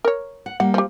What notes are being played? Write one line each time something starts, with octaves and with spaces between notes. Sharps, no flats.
A#4 C#5
F#5
G3 A#3 F#5
F3 G4